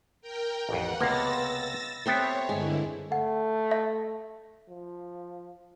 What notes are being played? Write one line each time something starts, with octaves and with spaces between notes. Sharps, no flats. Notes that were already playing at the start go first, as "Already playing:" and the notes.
A#4 G5
A1 F2 F#5
C#2 C3 A#3 B3 F5 E6 A6 A#6
B3 C4 G4 A4 C5 C#5 E5
G2 D3 G#3 E4
A3 F#5
E5
F3